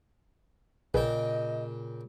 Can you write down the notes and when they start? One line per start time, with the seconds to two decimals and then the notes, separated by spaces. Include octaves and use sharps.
0.94 A#1 A#2 C#3 G#4 B4 D#5 G5